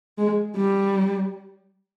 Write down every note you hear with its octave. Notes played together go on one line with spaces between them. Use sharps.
G#3
G3